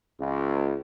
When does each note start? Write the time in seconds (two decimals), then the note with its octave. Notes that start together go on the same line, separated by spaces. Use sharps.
0.20 C#2